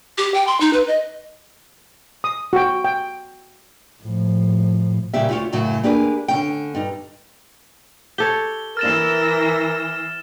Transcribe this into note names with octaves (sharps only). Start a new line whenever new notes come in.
G4
G5
C6
D#4
B4
D#5
D#6
F#4 G5
G5
A2 F3
A#2 C#3 G3 G4 E5
D2 F4 C#5
F#2 A2 C#3 F#3
A#3 D4 G4 G#4 B4
D3 C#4 G5
G2 D#4
G4 A4 C#5 G7
E3 A#4 E6 F6 A6 A#6 E7